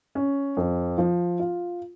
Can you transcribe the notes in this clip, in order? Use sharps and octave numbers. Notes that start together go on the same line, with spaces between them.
C#4
F2
F3
F4